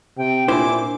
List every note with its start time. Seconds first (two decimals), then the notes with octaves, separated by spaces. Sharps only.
0.18 C3 G5
0.48 A#2 D4 E4 F4 C5 G#5 D6